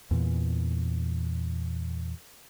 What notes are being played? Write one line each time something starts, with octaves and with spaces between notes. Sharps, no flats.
E2 A#2 E3